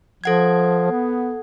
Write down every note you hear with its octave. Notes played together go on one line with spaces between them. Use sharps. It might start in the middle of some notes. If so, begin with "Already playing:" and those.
F3 A4 F#5 G#6
B3